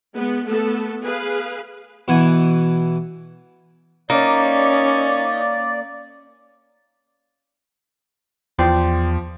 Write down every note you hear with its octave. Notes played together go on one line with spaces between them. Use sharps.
G#3 B3
A3 B3 A4
G#4 B4 F5
B2 E3 F#5 G#5
A#3 C#4 D#4 D5
E2 F3 D5 G5 C6